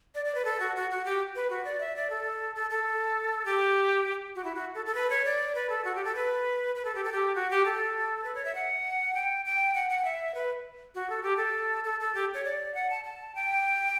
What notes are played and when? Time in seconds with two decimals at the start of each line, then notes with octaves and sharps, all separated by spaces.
0.15 D5
0.25 D5
0.35 B4
0.45 A4
0.60 F#4
0.76 F#4
0.91 F#4
1.05 G4
1.35 B4
1.50 F#4
1.65 D5
1.80 E5
1.96 D5
2.10 A4
2.55 A4
2.70 A4
3.45 G4
4.35 F#4
4.44 E4
4.55 F#4
4.75 A4
4.86 A4
4.95 B4
5.10 C#5
5.25 D5
5.55 B4
5.70 A4
5.85 F#4
5.95 G4
6.05 A4
6.15 B4
6.76 B4
6.85 A4
6.95 G4
7.04 A4
7.12 G4
7.35 F#4
7.50 G4
7.65 A4
8.24 B4
8.35 C#5
8.45 E5
8.55 F#5
9.15 G5
9.45 G5
9.75 F#5
9.90 F#5
10.05 E5
10.35 B4
10.95 F#4
11.10 A4
11.23 G4
11.37 A4
11.84 A4
12.00 A4
12.15 G4
12.34 C#5
12.44 D5
12.75 F#5
12.90 A5
13.04 A5
13.35 G5